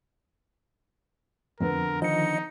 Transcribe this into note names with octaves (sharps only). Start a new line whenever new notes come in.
F2 D3 B3 A#4
D#3 F3 D#4 D#5 C#7